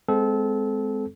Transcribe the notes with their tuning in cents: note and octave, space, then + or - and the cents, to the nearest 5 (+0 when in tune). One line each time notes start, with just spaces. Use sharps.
G#3 +0 C4 -20 A4 -25